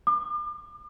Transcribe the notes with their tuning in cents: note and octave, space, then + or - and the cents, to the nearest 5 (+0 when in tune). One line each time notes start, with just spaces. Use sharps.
D6 +40